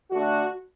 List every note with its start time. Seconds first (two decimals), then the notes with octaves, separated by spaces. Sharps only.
0.11 D3 A3 D4 F#4